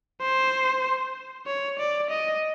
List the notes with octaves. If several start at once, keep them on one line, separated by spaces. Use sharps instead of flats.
C5
C#5
D5
D#5